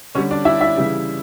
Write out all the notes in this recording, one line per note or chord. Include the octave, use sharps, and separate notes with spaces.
D3 G3 C#4 C#5
D4 D5
E4 E5
E4 E5
C#3 E3 G3